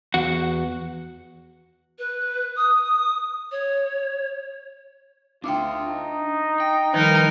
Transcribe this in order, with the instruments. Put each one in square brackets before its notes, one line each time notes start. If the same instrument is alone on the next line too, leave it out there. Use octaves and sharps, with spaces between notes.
[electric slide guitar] E2 F#4 F#5
[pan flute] B4
D#6
C#5
[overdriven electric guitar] D4 E5 [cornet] F4 [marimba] G5 D6
[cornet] D#4
[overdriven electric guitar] G5
[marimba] D#3 F3 G3 [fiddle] D#4 A#4 [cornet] B4